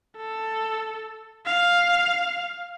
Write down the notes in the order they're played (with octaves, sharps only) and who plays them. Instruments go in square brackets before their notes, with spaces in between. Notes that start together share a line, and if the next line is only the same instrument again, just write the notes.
[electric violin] A4
F5